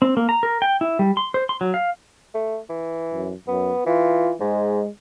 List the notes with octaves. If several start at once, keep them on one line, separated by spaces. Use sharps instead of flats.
C4
A#3
A#5
A#4
G5
E4
G3
C6
C5
C6
F#3
F5
A3
E3
F#2
F#2 B3
E3 F4
G#2 G#3